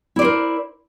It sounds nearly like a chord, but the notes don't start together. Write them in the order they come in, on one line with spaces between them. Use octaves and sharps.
E4 D5 C5 A#4